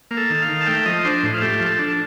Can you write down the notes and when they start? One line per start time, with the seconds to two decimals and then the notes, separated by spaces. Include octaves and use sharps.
0.11 A#3
0.17 A4
0.30 D#3
0.42 F5
0.49 D#3
0.61 A5
0.66 A3 G5
0.86 F3 D#5
1.05 D4 C5
1.23 A2
1.34 F4
1.42 A3 G4
1.60 F3
1.66 A4
1.79 D4